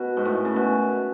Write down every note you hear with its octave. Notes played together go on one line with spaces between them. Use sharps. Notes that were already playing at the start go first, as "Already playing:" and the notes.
Already playing: B2
G#2
A2
C#3
B2